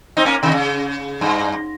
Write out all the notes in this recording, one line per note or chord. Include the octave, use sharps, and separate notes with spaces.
C4 D#4
A#3 C#4
C3 D#3
C#3
G2